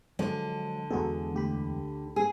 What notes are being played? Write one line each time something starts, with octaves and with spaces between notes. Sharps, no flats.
D3 F3 F#3 G#3
E2 G#3 B3 F#4 G#4 A4
D2 G4 B5
G#4